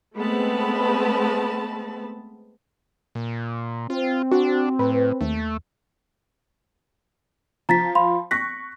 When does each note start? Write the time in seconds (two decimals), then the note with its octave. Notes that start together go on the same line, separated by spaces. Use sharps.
0.17 G#3 A3 B3 C4 A5 B5
3.15 A#2
3.90 C4 F4
4.32 D4 F#4
4.79 A2 B4
5.21 D#2 A3
7.69 F3 A#5 A6 B6
7.95 F5 B5 C6
8.31 C#6 F#6 A#6 B6